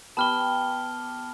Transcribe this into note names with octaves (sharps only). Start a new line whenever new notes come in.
B3 G4 A5 D6 F6 G7